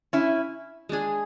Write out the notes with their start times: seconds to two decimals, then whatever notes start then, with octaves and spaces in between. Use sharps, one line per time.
0.13 C#4 E4
0.89 G#3 D4 G#4